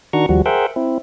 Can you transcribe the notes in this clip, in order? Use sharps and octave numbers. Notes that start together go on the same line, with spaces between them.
D#3 D4 F#4 A#5 C#6
D#2 F3 G3 F#4
G#4 A#4 C5 E5 F#5 G5
C4 E4